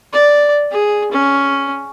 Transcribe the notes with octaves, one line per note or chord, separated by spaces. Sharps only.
D5
G#4
C#4